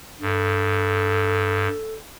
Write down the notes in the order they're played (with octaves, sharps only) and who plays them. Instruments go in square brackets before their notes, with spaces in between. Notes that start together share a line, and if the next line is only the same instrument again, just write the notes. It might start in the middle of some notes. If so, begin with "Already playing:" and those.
[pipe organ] G2 [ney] A4